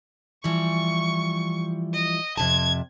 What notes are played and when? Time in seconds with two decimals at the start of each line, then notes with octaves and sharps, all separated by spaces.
0.44 E3 F3 G3 C#6
1.94 D#5
2.37 F2 C3 A5 G#6